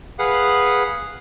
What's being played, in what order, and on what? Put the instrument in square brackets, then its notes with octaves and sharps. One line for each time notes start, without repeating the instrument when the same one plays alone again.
[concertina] G#4 B4 F5 F#5